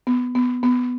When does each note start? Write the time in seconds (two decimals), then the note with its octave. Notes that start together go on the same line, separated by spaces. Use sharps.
0.07 B3
0.35 B3
0.63 B3